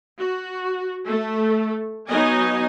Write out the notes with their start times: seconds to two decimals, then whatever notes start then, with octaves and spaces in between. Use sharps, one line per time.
0.18 F#4
1.05 A3 A4
2.08 F#3 B3 D#4 D#5 G#5